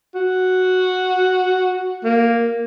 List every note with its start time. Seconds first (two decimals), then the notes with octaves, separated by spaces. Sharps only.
0.15 F#4
2.04 A#3